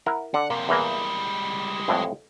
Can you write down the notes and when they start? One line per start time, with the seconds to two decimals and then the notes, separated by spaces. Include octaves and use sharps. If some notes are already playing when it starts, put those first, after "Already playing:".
0.06 E4 A#4 F#5
0.34 D3 F#5
0.50 F#2 C3 A#3
0.69 E2 E3 G3 G#3 A#3
1.88 F2 A2 E3